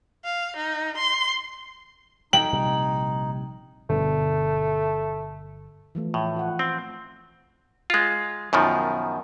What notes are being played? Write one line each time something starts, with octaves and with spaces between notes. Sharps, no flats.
F5
D#4
C6
D#4 G5 F#7
A#1 C3 G3
G1 B2 D3 A3
E3 F3 A3
A2
F4 F#5
C4
G#3 F4
F#2 B2 D#3 F3